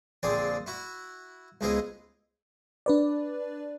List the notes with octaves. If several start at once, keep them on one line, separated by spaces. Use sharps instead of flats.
A#1 D3 C4 G#4 D5
E4 F#4
C#2 G#2 B2 E4 G#4 D#5
D4 B4 D5